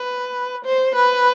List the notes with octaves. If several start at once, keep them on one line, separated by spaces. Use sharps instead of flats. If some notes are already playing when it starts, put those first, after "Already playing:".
Already playing: B4
C5
B4